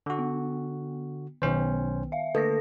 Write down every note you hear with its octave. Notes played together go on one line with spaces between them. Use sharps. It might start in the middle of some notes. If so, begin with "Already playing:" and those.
D3 F#4
B3
B1 D#3 B3 C#4 C5
E5 F5
D3 A3 A#3 A4 B4 A#6